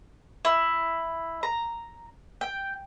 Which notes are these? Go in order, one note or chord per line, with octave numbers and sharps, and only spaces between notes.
E4
A#5
G5